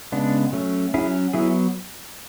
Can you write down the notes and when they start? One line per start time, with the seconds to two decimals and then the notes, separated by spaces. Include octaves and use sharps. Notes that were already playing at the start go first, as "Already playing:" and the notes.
0.12 C#3 G#3 B3 D4
0.52 F#3 A3 C#4
0.94 F#3 C#4 E4 G#4
1.33 F#3 B3 E4 G#4